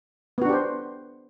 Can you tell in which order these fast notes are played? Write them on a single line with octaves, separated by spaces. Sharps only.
B3 F#4 D4 G4 C5